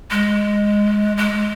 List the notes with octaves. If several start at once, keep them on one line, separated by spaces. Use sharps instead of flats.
G#3
G#3